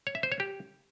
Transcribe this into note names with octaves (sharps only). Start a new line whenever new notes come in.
C#5
E5
C5
C#5
G4